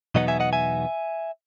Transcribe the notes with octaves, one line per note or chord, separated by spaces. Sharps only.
E2 B2 F#3 B3 D#4 D#5 F#5
E5 G#5
D#5 F#5
E5 G#5